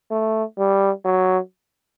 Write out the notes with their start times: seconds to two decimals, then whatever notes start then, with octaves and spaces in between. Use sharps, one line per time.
0.11 A3
0.58 G3
1.05 F#3